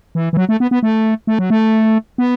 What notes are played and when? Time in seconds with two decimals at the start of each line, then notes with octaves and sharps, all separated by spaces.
0.15 E3
0.33 E3
0.37 F#3
0.49 A3
0.60 B3
0.71 B3
0.83 A3
1.27 A3
1.39 F#3
1.50 A3
2.18 B3